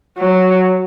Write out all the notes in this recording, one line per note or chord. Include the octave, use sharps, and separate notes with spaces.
F#3